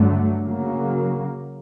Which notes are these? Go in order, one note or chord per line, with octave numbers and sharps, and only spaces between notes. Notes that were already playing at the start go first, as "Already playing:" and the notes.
Already playing: G2 D3 F#3 A3
C#3 F#3 A#3